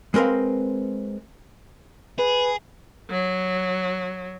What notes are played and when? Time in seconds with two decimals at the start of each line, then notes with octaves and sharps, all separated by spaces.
0.14 G#3 C4 A#4 B4 F5
2.19 G#4 B4
3.10 F#3